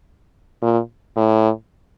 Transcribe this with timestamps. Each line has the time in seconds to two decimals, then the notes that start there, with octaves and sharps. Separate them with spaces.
0.62 A#2
1.17 A2